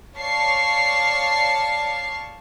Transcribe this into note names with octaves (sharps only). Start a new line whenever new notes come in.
C#5 D5 F5 A5 C#6 C7